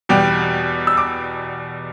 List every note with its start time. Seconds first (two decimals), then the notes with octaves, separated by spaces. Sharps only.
0.09 E2 B2 G3 G5
0.87 E6
0.97 D6